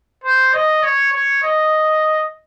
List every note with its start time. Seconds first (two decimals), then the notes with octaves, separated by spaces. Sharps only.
0.24 C5
0.53 D#5
0.83 C#5
1.13 C#5
1.43 D#5